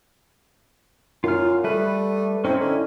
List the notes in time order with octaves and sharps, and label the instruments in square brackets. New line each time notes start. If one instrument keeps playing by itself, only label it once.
[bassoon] F#2 [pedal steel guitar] F4 F6
[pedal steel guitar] G3 B4 [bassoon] A3
[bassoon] C4 [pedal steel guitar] C#4 D#4 E4
[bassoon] D3